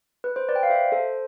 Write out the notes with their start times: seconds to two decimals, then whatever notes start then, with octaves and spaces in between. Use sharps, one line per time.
0.24 B4
0.36 C5
0.49 B4 D5
0.56 G5
0.63 F5
0.70 C5 E5
0.92 A4 C5